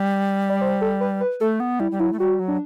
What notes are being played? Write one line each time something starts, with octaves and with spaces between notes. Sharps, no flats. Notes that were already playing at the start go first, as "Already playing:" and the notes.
Already playing: G3
D5
C5
A4
B4
B4
A3 A4
B3
G3 E4
G3
F#3 E4
A3
G3 F#4
F#3
D4